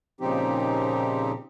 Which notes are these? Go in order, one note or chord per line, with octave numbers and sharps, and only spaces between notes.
A#2 C#3 F3 C4 D#4 G4